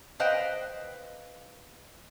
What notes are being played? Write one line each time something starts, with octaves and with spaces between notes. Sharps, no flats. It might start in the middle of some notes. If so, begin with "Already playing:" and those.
B4 C5 D#5 F5 G5